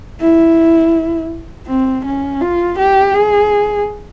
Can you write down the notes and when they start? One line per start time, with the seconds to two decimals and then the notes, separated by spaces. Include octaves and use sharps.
0.20 E4
1.67 C4
2.05 C#4
2.41 F4
2.78 G4
3.15 G#4